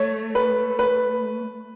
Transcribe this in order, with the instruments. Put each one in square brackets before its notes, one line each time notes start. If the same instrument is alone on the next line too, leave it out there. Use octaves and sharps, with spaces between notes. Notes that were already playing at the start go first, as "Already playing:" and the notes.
Already playing: [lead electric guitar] A3 [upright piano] C#5
[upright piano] B4
B4